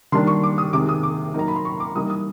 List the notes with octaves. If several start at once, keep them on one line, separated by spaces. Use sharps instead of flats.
D#3 G3 A#3 D4 C6
C#6
D6
D#6
C3 D#3 G#3 D6
D#6
D6
F#3 A#3 D#4 A#5
B5
C6
C#6
D6
E3 G3 A#3 D#4 D#6
D#6